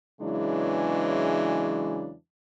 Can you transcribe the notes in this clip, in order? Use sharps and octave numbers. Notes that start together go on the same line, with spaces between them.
E2 C#3 E3 F#3 G#3 D4